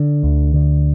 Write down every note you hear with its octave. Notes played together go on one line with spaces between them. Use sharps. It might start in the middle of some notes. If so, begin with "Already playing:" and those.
Already playing: D3
D2
D3